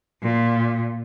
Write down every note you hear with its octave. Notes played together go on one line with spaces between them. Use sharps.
A#2